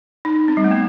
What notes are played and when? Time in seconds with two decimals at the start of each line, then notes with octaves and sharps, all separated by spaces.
0.25 D#4
0.48 C4
0.57 G3
0.64 A3
0.71 B3